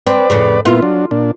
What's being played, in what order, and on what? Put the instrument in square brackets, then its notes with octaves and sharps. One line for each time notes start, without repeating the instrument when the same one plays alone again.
[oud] C4 [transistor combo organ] B4 D5
[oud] F2 A2 C#3
[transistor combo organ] A#2 B3 E4 [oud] F4
[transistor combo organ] F#3 D4
A#2 D4